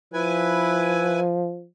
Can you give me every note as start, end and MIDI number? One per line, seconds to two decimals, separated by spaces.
0.13 1.67 53
0.13 1.20 64
0.13 1.20 71
0.13 1.20 80